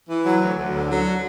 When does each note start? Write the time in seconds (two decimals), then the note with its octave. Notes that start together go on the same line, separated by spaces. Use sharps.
0.09 E3
0.25 F#3
0.41 D2
0.57 D2
0.74 D3
0.90 F#3